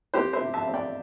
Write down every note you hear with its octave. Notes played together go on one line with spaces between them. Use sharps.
C4 G4 C5
C5 E5
C3
E5 A5
C4
D5 G5